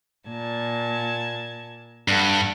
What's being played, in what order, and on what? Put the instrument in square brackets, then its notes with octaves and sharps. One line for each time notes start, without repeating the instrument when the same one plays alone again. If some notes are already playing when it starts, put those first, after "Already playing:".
[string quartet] A#2 A5 G#6
[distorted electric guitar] G2 [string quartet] A4 F#5 A5